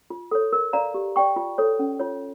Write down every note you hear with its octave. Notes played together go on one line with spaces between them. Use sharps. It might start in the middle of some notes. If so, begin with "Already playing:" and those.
F4
A4 C#5
A#4
D5 F5 A#5
G4
D5 G5 C#6
F4
A4 C#5
C#4
F4 C#5